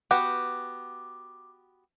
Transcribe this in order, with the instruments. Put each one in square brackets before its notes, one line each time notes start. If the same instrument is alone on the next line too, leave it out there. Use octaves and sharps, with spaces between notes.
[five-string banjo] B3 F#4 G4 [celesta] D6